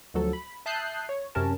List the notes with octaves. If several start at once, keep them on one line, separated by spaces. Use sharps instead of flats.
D2 F3 F#3 A4
B5
E5 A5 D#6 F#6 G6 C7
C#5
F#2 C3 C#4 A#4 A5